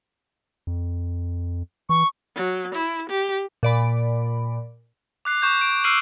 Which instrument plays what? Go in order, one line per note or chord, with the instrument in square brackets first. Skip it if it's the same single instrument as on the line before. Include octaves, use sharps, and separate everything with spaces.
[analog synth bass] F2
[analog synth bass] E3 [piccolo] C#6
[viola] F#3
E4
G4
[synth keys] A#2 D5 B5
[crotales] D6 F#6 C7
C#6 G6
D7
E6 F6 C7 D7 D#7 F#7